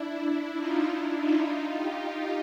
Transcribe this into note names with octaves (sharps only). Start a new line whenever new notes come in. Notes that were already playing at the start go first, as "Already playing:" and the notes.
Already playing: D4 E4
D#4 F4
D4 E4
D#4 F4
F4 G4